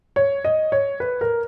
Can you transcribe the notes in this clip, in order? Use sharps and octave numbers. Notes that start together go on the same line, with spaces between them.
C#5
D#5
C#5
B4
A#4